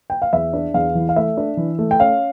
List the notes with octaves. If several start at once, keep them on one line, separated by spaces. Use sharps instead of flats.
G5
F5
E2 E5
D4
E2 F5
E3
F5
A3 E5
D4
E3
A3
G5
C#4 F5